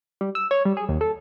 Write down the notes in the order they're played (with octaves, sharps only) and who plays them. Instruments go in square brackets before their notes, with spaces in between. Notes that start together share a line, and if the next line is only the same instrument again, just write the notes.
[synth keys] G3
E6
C#5
G3
G#4
D#2
A4